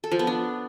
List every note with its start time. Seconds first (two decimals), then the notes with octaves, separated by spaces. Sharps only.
0.04 A4
0.11 F3
0.19 B3
0.27 D4